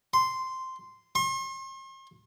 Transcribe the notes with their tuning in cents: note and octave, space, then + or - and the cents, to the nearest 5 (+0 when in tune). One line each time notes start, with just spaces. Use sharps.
C6 -5
C6 +45